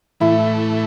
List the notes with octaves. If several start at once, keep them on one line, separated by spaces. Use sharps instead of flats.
A2 E3 A3 E4